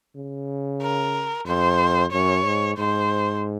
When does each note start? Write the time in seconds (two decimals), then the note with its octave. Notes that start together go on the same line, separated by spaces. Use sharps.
0.16 C#3
0.82 A#4
1.46 F2 C5
2.12 F#2 C#5
2.45 G#2
2.77 G#2 C5